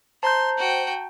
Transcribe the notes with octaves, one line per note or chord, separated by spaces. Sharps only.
C5 A5 A#5 C6 G6
F#4 G5